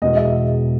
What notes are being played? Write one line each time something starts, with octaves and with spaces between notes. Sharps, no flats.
E1 E2 B2 G#3 B3 D#5
E5